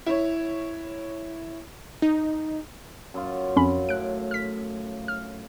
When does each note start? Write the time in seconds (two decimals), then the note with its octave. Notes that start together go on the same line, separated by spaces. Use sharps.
0.06 E4 C#5
2.02 D#4
3.14 F#2 F4
3.56 F2 C#4 B5
3.89 A2 F#6 D7
4.31 F6 B6
5.08 F6